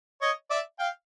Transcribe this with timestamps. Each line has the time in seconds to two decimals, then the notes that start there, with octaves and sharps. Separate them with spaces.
0.22 C#5 D#5
0.50 D5 E5
0.79 F5 G5